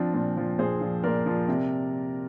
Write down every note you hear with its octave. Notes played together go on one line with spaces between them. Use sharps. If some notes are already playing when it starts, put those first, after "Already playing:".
Already playing: F3 C4 D4
A#2
F3
A#2 G#4 C5
F3
A#2 A#4 D5
F3
C3